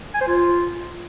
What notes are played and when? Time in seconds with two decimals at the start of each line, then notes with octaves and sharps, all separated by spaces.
0.14 G#5
0.21 C5
0.27 F4